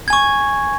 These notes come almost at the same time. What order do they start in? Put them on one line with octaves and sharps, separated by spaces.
G#6 G#5 C#6